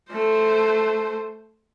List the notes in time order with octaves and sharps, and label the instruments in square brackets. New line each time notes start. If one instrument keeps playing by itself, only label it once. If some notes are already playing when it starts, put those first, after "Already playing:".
[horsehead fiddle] A3 C5